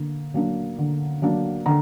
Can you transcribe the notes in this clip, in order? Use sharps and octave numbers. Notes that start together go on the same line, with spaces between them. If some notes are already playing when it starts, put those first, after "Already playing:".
Already playing: D3 A#3
F#3 A#3 D4
D3
F#3 A#3 D4
D3 A#5